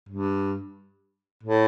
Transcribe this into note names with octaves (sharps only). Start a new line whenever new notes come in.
G2
A2